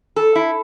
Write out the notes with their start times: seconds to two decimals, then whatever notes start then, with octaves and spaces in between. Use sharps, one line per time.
0.16 A4
0.35 E4